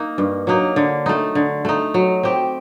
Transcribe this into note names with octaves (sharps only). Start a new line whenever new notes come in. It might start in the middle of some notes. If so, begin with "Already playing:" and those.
Already playing: A#3 D#4
G2
F#3 A#3 D#4
D3
A3 D#4
D3
A3 D#4
F#3
C4 G4